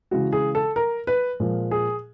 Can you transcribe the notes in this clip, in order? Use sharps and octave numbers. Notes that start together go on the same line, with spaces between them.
C#3 E3 G#3 F#4
G#4
A4
A#4
B4
A#2 F3 G#3
G#4